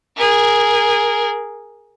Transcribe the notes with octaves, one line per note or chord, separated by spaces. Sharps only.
G#4 A#4